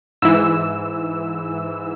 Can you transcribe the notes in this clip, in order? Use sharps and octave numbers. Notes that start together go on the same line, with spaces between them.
G#2 E3 E6